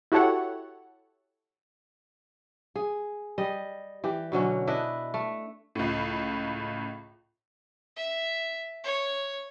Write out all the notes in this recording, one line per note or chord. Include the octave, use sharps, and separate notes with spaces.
E4 F#4 G4 A4 C#5 F#5
G#4
G3 D#5
E3 G4
B2 D3 F#3 C#4
D4 E4 B4 D#5
A3
C#2 A2
E5
C#5